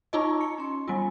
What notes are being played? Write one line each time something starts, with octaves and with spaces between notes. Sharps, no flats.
D#4 F4 D#5 A5 A#5 C#6
C#7
C#4 C6
G3 B3 F4 G#5